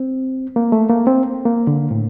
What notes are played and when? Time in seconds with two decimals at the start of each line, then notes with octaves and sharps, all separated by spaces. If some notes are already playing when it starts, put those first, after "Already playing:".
Already playing: C4
0.56 A#3
0.72 A3
0.90 A#3
1.07 C4
1.45 A#3
1.67 D3
1.91 A2